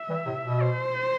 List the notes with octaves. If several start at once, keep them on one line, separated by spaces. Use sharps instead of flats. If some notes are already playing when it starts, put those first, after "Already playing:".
Already playing: E5
E3 G3
A2 C3
B2
C5